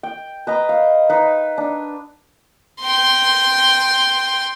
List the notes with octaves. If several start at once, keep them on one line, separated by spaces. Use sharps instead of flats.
G5
B4 D#5 A#5
F5
D#4 B4
D4
G5 C6